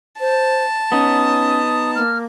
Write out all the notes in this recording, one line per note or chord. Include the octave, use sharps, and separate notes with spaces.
C5 A5
B3 C#4 D#4 D#6
A#3 F6